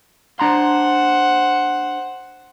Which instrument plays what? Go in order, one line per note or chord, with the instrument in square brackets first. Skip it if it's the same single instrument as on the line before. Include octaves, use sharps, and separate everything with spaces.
[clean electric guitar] D4 A#5 C6 [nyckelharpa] C5 F#5